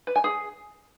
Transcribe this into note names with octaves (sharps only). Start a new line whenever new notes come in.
B4
G#5
G#4